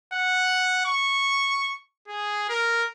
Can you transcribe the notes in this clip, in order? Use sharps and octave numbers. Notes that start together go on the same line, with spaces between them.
F#5
C#6
G#4
A#4